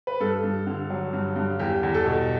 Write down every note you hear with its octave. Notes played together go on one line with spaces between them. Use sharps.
B4
G2 A4
G2
D3
F#3
G2
G2
E2 G4
E2
A4
B2